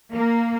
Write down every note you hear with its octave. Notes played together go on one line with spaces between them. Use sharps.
A#3